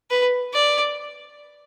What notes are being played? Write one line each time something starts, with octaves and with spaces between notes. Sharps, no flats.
B4
D5